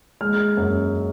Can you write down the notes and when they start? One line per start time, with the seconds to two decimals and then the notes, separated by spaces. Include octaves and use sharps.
0.21 G#3 F6
0.57 F#2